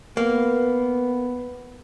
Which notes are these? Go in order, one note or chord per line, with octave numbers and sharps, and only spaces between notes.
A#3 B3